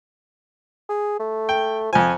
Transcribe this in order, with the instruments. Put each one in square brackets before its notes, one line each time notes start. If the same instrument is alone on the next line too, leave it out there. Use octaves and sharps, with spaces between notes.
[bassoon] G#4
A3
[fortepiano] G5
[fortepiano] F2 G#5 [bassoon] F3